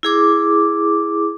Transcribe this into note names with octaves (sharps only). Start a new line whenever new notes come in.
E4 G#4 D6